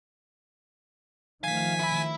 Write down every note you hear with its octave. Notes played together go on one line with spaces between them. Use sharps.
D#3 F3 A3 F5 G#5 B6
E4 B5